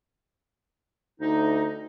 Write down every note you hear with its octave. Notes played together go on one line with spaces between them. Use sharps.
D2 D#4